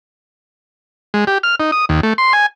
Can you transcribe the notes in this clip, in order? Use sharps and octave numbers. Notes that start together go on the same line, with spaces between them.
G#3
G4
F6
D#4
D#6
D#2
A3
C6
G#5